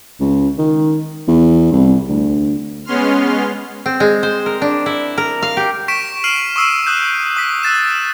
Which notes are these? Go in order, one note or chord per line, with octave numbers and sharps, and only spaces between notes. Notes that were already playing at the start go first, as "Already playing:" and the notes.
C#2
D#3
E2
C2
D2
G#3 B3 C#4 C6 F6
C4
G#3
C5
A#4
D4
E4
A#4
F5
G4
C#6 B6 D7 E7
F6 C7 D#7 E7 F#7
C#6 D#6 E6 C7 E7
D#6 F#6 G6
D#6 B6
E6 F#6 A6 E7